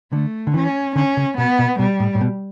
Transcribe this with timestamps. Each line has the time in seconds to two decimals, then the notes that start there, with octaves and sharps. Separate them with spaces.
0.12 D3 A3
0.47 D3
0.54 E3 C#4
0.96 D3 C#4
1.17 C#3
1.37 B2 B3
1.59 B2
1.79 B2 G3
2.00 A2
2.15 A2
2.21 B2